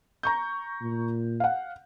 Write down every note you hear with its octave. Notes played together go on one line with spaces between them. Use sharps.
A#5 C#6 G6
A#2
F5 F#5